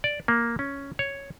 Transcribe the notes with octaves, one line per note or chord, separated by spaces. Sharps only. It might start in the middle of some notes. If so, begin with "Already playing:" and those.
D5
A#3
C#4
C#5